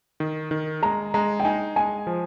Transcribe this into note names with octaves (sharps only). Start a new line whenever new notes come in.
D#3
D#3
G#3 A#5
G#3 A#5
G5
D#4 G#5
G#3 G#5
F3